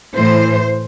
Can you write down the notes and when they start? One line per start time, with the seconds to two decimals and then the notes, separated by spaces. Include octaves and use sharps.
0.16 A2 E3 C5